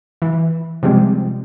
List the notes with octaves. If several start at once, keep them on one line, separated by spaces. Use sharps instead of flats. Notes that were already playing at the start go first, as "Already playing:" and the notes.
E3
C3 F3 G3 G#3 C4